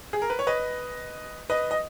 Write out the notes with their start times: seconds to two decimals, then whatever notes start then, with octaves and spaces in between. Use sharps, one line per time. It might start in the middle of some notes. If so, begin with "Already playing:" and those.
0.13 G#4
0.22 A#4
0.30 B4
0.39 C#5
0.47 B4 D#5
1.50 B4 D#5
1.71 D#5